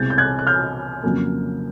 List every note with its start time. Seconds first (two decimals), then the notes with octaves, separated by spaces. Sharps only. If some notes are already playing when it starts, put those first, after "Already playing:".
Already playing: C2 B2 G#3 C4 G6 A6
0.10 G6
0.18 F#6 G#6
0.39 F#6
0.47 F6 G6
1.03 F2 C#3 F#3 A#3